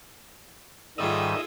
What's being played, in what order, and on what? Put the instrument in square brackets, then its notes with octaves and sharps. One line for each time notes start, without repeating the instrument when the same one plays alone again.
[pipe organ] G#2 D#3 G3 [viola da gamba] F4 G#4 A4 [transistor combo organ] D#5 E5